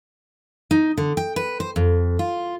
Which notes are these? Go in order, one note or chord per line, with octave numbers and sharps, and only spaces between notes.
D#4
D3
G5
B4
C5
F2
F4